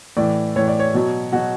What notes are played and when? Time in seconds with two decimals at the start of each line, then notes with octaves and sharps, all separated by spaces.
0.17 A2 E3 D5
0.56 A2 E3 C#5
0.68 D5
0.80 C#5
0.94 B2 F#3
1.32 B2 F#3 F#4